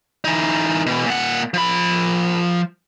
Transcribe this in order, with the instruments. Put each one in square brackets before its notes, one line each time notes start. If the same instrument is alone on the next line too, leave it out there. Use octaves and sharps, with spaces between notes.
[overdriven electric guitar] E3 D#4
B2 E3
A#2 F#5
F3 B5